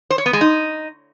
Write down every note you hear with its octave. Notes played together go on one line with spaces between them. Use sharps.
C5
C#5
B3
G#3
D#4